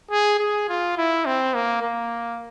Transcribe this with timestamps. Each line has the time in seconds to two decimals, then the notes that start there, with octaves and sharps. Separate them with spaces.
0.11 G#4
0.39 G#4
0.69 F4
0.97 E4
1.26 C4
1.54 A#3
1.82 A#3